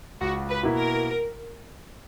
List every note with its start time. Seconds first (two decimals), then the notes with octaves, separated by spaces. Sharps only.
0.21 C#2 F#4
0.49 B4
0.63 B2 A#3 E4
0.78 A#4